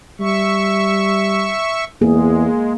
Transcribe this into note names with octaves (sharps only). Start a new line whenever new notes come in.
G3 E5 C#6
E2 G#3 A#3 G#4